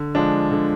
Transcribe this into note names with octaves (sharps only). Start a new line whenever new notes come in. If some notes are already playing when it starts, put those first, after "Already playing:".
Already playing: D3
F3 G#3 D4
D3